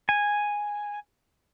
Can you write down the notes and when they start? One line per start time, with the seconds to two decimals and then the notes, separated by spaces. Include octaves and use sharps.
0.09 G#5